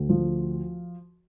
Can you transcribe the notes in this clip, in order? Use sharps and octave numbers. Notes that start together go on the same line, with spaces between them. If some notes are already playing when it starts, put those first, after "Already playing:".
Already playing: D2
F3